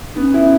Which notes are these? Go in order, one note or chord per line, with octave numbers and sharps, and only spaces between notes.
B3 C#4 D#4
E4